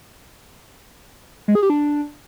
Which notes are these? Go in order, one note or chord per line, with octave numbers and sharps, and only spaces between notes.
G#3
G#4
G4
D4